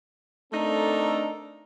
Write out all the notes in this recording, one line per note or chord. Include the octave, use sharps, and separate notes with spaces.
A3 C4 D4 D#4 A4 A#4